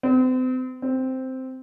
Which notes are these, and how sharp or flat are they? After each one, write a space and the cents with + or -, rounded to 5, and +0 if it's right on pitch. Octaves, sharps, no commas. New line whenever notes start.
C4 -40
C4 -5